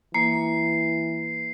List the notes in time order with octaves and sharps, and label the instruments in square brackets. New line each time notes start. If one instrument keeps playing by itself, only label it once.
[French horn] E3 [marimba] A#3 [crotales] C7